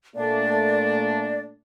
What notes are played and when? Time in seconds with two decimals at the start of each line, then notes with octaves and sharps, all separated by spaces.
0.16 A#2 A3 D4 D5